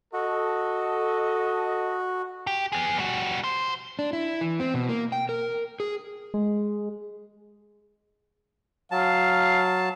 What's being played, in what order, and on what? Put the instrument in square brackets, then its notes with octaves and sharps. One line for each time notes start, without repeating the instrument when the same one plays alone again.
[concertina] F#4 [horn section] A4 [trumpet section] D#5
[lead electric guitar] G4
B3 G#4
G3 F#4
C5
[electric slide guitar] D4
E4
E3
C4
B2
A#3
G5
A#4
G#4
[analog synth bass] G#3
[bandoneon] F#3 A5 [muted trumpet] F5